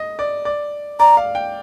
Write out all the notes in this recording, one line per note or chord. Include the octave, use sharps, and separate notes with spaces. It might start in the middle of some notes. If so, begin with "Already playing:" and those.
Already playing: D#5
D5
D5
D5 A#5
F5
G5